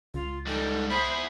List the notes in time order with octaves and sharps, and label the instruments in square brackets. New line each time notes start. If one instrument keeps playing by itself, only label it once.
[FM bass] C#2 [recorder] F4
[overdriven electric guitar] G#2 G3 [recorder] A4
[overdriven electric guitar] E4 G#4 [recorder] C5 [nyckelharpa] B5